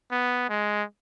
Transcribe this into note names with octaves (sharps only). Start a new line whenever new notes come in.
B3
G#3